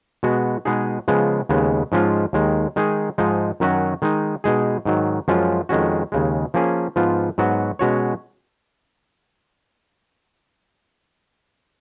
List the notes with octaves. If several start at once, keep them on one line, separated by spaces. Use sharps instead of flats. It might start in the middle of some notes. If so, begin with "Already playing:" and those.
B2 G#3 B3 F#4
B2 G#3 B3 D#4 G#4
C#3 F3 G#3 B3
D#2 C#3 G#3 B3
G#2 F3 G#3 C#4 F4
D#2 D#3 G#3
D#3 G#3 D#4 G#4
G#2 F3 G#3 D#4
F#2 D#3 F#3 C#4 F#4
D#3 G#3 D#4
B2 G#3 D#4 G#4
G#2 D#3 F#3
F#2 F3 G#3 C#4 F4
F2 D#3 G#3 C#4 F#4
D#2 C#3 G#3
F3 A#3 C#4 G#4
G#2 F3 B3 F4
G#2 F#3 B3 F#4
B2 G#3 C#4 F#4 C#5